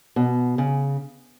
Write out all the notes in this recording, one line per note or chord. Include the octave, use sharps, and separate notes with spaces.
B2
C#3